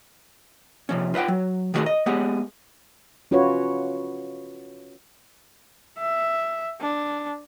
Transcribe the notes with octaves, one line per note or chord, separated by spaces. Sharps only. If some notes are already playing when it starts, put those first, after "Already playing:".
C3 F3 C#4
F4 B4 D#5 F#5 G5
F#3
D#3 G3 A3 F#4 G#4 A#4
D#5
G#3 B3 G4 G#4 F#5
C#4 F4 F#4 B4 C#5
E5
D4